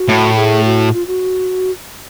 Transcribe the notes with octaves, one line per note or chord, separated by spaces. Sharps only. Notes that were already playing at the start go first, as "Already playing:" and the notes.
Already playing: F#4
A2
G#4
F#4
F4
F#4